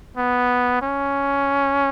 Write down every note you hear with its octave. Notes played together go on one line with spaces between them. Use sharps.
B3
C#4